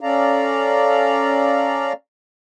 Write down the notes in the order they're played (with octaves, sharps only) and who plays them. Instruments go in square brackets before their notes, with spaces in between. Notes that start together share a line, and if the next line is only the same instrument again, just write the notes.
[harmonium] C#4 A4 D5 F5 A#5